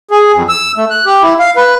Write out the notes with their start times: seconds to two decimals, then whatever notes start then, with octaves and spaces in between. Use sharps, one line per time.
0.11 G#4
0.34 F2
0.49 E6
0.77 A3
0.90 F#6
1.05 G4
1.23 E4
1.39 F5
1.56 B4